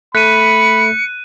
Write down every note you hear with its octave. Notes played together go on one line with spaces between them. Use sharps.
A3 B5 F#6 B6 C#7 D#7